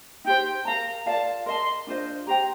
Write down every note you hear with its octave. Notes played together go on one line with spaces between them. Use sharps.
D#4 G4 C5 G5
A#4 F5 A5 A#5
F4 A#4 D5 F5 A5
A#4 D#5 A5 C6
D4 F4 C5 D#5
G4 C5 G5 A#5